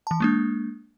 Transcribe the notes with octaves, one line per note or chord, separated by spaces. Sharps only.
E3 A5
G#3 A#3 D4